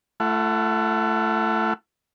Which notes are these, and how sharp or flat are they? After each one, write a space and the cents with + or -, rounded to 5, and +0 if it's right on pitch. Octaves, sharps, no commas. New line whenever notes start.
A3 +0 E4 +45 F#5 +5